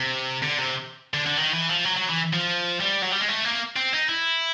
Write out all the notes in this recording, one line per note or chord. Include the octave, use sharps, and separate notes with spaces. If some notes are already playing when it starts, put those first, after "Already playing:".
Already playing: C3
D3
C3
D3
D3
D#3
E3
F3
F#3
F#3
E3
F3
G3
F#3
G3
G#3
A3
A#3
C4
D#4
E4